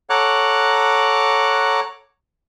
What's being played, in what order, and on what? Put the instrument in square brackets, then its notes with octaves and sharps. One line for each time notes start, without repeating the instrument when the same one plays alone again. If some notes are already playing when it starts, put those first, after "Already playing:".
[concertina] A4 C#5 F#5 A#5 D6 F#6